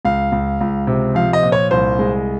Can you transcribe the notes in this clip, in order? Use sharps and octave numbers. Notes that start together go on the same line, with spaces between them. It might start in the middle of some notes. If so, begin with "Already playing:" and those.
C#2 F5
C#2
C#2
C3
F3 F5
D#5
A#2
C#5
C2 C5
G#3